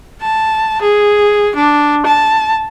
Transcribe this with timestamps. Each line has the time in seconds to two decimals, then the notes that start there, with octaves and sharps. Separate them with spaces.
0.22 A5
0.82 G#4
1.55 D4
2.06 A5